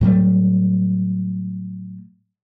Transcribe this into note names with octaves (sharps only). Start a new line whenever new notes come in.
A2 F#3 G3 A3